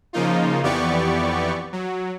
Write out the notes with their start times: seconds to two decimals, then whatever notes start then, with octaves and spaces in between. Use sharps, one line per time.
0.13 C#3 F3 A#3 D#4 F4
0.62 F2 E3 B3 G4 D5 C#6
1.72 F#3